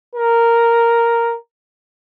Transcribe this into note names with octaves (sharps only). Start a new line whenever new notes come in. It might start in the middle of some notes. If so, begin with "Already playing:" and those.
A#4